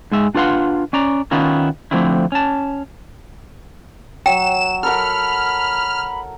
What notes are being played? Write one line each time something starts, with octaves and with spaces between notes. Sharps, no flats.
G#2 G#3 E5
D4 F4 B4 F5 F#5 C6
C#4 D5 A#5
D#3 B3 C#4 E4 F4 A#4
D3 F3 A3 C4 C#4 E4
C#4 A5
F#3 G5 E7
A4 A#4 F#5 B5 F6